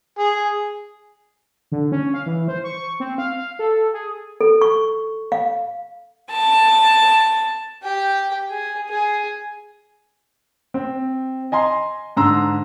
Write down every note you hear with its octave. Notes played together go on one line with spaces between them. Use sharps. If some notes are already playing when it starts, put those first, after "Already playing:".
G#4
D3
C#4
F5
E3
C5
C#6
C4
F5
F5
A4
G#4
A4
C#6
F5
A5
G4 G5
G#4
G#4
C4
D#5 G#5 A#5 C6
G#2 D3 A#5 C6 E6